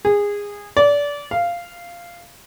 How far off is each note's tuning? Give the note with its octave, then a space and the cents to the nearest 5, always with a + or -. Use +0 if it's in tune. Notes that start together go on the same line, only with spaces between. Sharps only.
G#4 -20
D5 -25
F5 -10